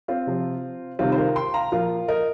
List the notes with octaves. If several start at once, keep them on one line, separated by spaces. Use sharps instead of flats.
C4 F4
C3 F3
C3 D#3 G3 C4 F4
C5
F4 A#4
G5 C6
F5 A#5
A#2 F3 F4 A#4
A#4 D#5